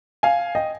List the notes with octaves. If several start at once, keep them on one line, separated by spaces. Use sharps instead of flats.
F5 G#5
D#5 G5